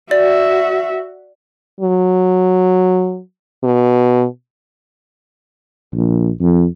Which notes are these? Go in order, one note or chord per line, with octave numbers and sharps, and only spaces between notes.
F#4 D5 E5
F#3
B2
A#1
F2